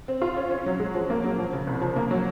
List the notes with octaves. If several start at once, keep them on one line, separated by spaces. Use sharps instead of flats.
C4
F4
C#4
C#4
F#3
G#3
F3
A#3
F#3
F3
C#3
C2
F3
A#3
F#3